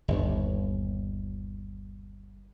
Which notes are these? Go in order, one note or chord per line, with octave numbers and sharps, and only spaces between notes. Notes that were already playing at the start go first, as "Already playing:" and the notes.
G1 D#2